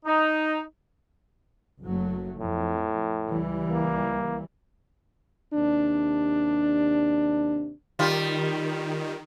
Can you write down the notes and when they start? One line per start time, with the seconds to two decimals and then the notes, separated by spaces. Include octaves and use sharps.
0.06 D#4
1.83 F#1 F#3 A3
2.40 F2 A2
3.27 C#2 E3 G3
3.70 A#3
5.54 D#2 C3 D4
7.99 D#3 G3 F4